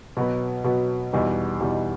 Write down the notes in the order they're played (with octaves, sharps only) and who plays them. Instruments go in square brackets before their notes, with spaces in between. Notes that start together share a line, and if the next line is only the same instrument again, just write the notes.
[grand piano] B2 F#3 B3
B2 F#3 B3
E2 B2 G3 D#4
E2 B2 G3 D#4